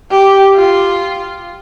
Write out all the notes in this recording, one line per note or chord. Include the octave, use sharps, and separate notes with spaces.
G4
F4